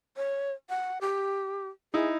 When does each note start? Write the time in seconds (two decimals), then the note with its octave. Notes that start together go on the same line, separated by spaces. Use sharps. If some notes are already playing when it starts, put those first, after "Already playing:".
0.17 C#5
0.69 F#5
1.01 G4
1.94 D#4 E4 G#4